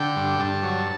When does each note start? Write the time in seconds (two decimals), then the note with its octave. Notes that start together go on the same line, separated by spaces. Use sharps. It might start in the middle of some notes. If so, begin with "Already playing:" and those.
Already playing: D3 G5
0.16 G2
0.39 G2 A5
0.63 F#3